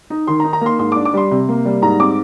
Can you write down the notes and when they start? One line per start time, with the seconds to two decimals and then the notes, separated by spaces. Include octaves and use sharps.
0.10 D#4
0.27 D#3 C6
0.40 A#5
0.44 D#4
0.53 A#5
0.61 A#3 C6
0.79 G#2 C6
0.92 D4 D6
1.05 D6
1.14 G3 C6
1.31 C3
1.49 A#3
1.65 G3
1.82 G#2 A#5
2.00 C4 D6